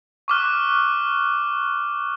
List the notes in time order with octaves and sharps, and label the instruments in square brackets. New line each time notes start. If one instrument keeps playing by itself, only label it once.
[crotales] C#6 D6 F6 F#6